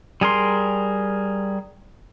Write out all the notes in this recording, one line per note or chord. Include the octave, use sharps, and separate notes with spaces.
G3 G#4 A#4 C6